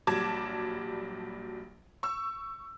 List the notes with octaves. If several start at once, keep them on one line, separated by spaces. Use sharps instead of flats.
A#1 F#3 G3 A5 D6 G#6
C#6 E6